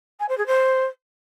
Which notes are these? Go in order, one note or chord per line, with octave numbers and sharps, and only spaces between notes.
G#5
C5
G#4
C5